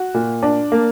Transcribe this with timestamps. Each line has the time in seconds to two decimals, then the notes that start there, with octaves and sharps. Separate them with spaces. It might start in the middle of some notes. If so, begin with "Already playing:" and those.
Already playing: F#4
0.14 A#2
0.43 D4
0.72 A#3